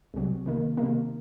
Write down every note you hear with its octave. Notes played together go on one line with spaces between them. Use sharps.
C2 C3 F#3
C3 D#3 A#3
C3 D#3 A#3